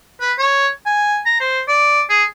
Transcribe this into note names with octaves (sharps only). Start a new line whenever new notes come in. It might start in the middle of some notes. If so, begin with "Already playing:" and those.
B4
C#5
G#5
A#5
C5
D5
G#4